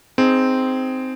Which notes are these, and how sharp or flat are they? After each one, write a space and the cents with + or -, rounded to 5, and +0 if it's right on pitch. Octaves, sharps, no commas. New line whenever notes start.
C4 -10 D#4 +0 G#4 +5